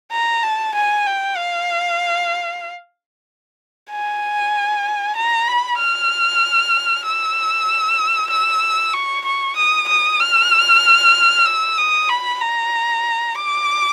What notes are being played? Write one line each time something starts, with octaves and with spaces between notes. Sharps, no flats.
A#5
A5
G#5
G5
F5
G#5
A#5
B5
F6
E6
E6
C#6
C#6
D#6
D#6
F6
E6
D#6
B5
A#5
D6